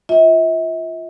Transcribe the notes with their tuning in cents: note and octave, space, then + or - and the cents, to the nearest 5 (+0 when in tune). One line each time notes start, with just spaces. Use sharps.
F4 +0 E5 -40